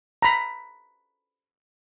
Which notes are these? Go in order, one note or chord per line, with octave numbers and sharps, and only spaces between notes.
A#5 B5